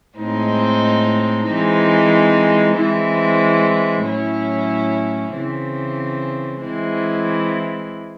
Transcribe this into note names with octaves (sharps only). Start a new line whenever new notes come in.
A2 G#3 C4 D#4
E3 G#3 C4 D#4
E3 G#3 C4 E4
A2 F#3 C#4 E4
C#3 E3 C4
E3 G#3 C4 E4